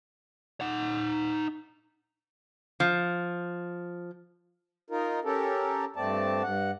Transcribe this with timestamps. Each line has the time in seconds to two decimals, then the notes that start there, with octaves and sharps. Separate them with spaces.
0.61 D#4 F#5
2.80 F3
4.90 D#4 F4 A#4
5.25 C#4 G4 A4 A#4
5.96 G2 A3 C4 D5 A5
6.43 G2 F#5